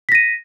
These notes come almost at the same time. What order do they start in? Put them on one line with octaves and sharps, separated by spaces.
B6 A#6 D#7